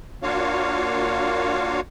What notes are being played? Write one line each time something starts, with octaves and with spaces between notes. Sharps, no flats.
A#3 D4 F4 F#4 C#5 F5